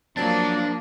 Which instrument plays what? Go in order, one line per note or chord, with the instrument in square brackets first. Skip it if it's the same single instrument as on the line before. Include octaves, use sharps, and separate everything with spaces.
[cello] F3 A#3 [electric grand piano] F#3 C4 A6 [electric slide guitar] D4